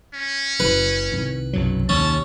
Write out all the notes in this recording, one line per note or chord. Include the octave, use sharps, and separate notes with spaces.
C#4
F#1 B4
C2 D#3
B1 F#2 F#3
D#2 C#4 A5